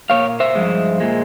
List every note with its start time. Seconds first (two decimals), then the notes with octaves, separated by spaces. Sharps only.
0.10 A#2 G3 A#3 C#5 F5
0.40 C5 E5
0.55 G2 F3 G#3
1.00 A#2 G#3